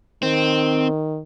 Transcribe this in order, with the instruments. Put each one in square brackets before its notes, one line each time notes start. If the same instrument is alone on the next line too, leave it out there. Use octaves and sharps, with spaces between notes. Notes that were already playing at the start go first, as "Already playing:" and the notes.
[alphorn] D#3 [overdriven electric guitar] C4